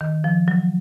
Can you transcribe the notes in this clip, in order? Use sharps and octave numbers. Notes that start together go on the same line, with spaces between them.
D#3
F3
F#3